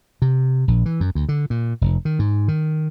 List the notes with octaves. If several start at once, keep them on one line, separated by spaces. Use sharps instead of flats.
C3
A#1
E3
F#2
D2
D3
A#2
F1
D#3
G#2
D#3